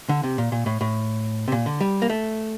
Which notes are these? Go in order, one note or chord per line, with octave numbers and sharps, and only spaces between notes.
D3
C3
A#2
A#2
A2
A2
C3
A#2
D3
G3
A#3
A3